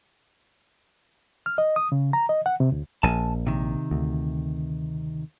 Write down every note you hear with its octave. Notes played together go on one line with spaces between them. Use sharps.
F6
D#5
D#6
C#3
A#5
D#5
F#5
C3
D2
A#1 G#5 A5
C3 D#3
D2